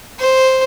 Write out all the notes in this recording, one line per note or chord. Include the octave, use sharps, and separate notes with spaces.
C5